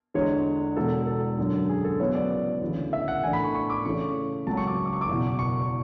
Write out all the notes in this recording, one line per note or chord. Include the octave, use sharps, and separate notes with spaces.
E2 D3 G#3 C#5
E1 E2 B2 A4
A4
F#2 D3 F#3
G#4
A4
C#3 F#3 B3 E4 C#5
D5
D5
D2 C#3 E3
E5
F#5
A2 E3 A3 D4 G#5
B5
C#6
C#6
D6
C#3 E3 A3 C#4 C#6
C#2 C#3 F#3 A5
C#6
D6
D6
C#6
D6
F#1 E2 B2
C#6